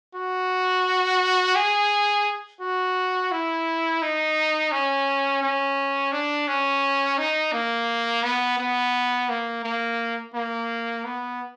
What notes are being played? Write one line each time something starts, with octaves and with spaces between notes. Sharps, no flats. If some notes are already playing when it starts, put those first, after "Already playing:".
F#4
G#4
F#4
E4
D#4
C#4
C#4
D4
C#4
D#4
A#3
B3
B3
A#3
A#3
A#3
B3